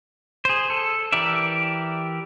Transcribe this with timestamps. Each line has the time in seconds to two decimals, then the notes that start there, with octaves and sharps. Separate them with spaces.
0.45 G#4 C5
0.70 A4
1.12 E3 G4 A#4 D5 E5